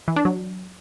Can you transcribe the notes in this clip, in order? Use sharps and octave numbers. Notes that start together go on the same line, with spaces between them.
E3
D4
F#3